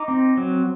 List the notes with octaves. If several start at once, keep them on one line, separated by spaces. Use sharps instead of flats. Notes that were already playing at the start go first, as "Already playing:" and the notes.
Already playing: D#4 A#5 D6
C4
F#3